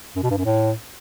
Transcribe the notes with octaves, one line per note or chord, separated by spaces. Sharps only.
F#2
B2
G2
F#2
A2